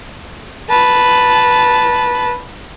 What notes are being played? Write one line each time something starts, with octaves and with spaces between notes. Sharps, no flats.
B4 A5